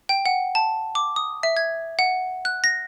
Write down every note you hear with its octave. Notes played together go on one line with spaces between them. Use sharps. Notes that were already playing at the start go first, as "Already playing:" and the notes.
G5
F#5
A5
D6
D#6
E5
G#6
F#5
F#6
A#6